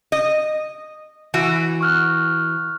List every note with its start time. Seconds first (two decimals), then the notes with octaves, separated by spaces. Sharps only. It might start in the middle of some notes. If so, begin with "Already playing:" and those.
0.12 D#5
1.34 E3 F#4
1.81 C#6 F6 F#6